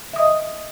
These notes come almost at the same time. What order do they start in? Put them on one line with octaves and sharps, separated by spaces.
E5 D#6 D#5